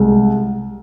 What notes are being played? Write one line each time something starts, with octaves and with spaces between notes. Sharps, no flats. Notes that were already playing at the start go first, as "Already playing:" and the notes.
Already playing: C2 G#3